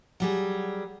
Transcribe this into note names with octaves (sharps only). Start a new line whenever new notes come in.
F#3 G3 G#4